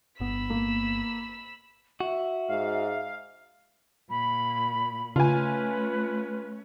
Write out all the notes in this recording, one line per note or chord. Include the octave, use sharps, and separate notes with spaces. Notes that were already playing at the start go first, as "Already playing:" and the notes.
G1 B3 B5 E6
A#3
F#4 E5
G#2 F5
A#2 B5
C#3 A3 C#4 F4 B4 G#5